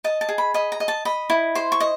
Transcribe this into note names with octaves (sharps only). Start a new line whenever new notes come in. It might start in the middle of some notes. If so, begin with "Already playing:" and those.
D#5 A5
A5
G#4
B5
D#5 B5
A#5
D#5
A5
D#5 B5
E4
C5 C6
C#6
D#5